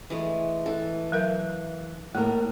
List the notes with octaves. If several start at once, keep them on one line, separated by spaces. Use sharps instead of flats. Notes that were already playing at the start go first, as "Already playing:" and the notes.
E3 G#3 A3
E3 A4
F#3 A#4 E5
A2 G3 A#3 D#4 A#4